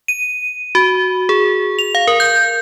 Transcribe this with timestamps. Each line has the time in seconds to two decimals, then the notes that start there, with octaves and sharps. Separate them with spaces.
0.08 D#7
0.75 F#4
1.29 G#4
1.79 F7
1.95 F5
2.07 A#4
2.20 G6